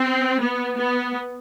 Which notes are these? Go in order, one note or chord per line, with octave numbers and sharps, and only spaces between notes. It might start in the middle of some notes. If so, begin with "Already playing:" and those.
Already playing: C4
B3
B3